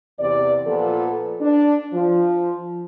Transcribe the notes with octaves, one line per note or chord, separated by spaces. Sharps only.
E2 C3 D5
A#2 F3 B3 A4
D4
F3